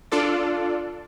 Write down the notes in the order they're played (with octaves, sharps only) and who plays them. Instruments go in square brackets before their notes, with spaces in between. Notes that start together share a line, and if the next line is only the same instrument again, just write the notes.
[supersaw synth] D4 F4 A4 D5